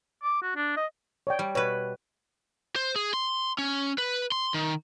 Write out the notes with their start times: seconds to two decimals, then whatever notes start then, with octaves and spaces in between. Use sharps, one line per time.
0.23 D6
0.42 F#4
0.56 D4
0.77 D#5
1.27 C#5 D5 G5
1.39 G3
1.55 B2 B4 C#5
2.76 C5
2.96 G#4
3.14 C6
3.58 C#4
3.98 B4
4.32 C6
4.54 D#3